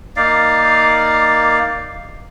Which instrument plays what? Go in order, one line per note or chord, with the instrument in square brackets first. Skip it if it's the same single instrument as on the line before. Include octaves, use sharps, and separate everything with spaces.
[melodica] A#3 D#4 D5 F5